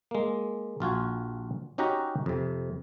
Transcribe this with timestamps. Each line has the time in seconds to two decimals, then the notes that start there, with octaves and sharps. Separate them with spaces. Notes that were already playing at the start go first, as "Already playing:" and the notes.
0.11 G#3 A#3
0.80 A#1 F4 F#4 G#5
1.78 C#4 D#4 F#4 G4 F#5 A#5
2.26 F2 C3